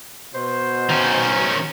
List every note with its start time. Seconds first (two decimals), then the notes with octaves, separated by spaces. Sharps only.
0.35 B2 C5
0.90 D#3 C#4